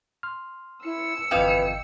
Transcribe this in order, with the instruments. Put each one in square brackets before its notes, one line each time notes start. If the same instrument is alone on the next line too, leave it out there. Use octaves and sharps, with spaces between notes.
[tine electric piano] C6 F6
[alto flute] E4 [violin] E6 C#7
[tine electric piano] G1 D#5 G5 [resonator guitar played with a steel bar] F2 E3 F5 [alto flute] B4